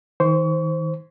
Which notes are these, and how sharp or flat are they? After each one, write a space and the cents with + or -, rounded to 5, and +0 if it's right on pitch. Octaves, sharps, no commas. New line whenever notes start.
D#3 +40 C5 +0 C#6 +35